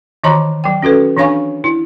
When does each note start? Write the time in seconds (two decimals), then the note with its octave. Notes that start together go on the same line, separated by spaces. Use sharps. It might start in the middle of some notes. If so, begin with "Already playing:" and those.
0.24 D#3 E3 D#5 A5 A#5 D6
0.64 F#3 G5
0.82 C#4 F#4 A4 B4
1.17 E3 D4 C#5 F5 G#5 C#6
1.64 E4